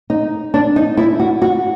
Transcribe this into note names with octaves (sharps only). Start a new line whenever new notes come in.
D#4
D4
D#4
E4
F#4
F#4